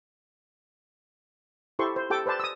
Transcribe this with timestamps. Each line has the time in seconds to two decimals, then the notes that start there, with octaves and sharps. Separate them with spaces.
1.79 E4 G4 A4 C5 C6 C#6
1.96 C5
2.10 G4 A4 G5 A5 D6
2.26 B4 C5 D5 A5
2.40 D#6 E6